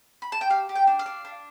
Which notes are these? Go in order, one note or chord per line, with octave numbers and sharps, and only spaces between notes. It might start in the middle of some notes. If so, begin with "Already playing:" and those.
B5
A5
G5
G4 F5
G4
G5
D4
F5
D4
D4